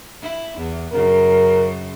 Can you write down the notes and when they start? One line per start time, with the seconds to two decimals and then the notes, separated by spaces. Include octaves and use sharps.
0.22 E4
0.58 E2
0.92 F#2 C#3 A#4